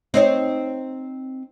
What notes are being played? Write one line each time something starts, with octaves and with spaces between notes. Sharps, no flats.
C4 D#4 C#5